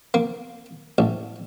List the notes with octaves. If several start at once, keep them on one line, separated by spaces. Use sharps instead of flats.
A#3
A1